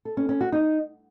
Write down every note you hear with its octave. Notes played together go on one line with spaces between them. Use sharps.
A4
C#4
C#4
F#4
D#4